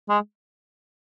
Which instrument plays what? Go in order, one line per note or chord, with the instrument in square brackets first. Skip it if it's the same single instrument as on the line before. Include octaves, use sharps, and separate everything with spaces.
[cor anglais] G#3